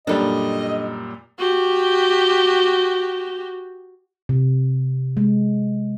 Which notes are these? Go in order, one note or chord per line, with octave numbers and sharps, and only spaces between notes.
F#2 A#2 G3 D4 A4 D#5
F#4 G4
C3
G#3